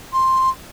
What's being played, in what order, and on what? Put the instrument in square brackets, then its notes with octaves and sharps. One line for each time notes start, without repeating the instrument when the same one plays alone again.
[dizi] C6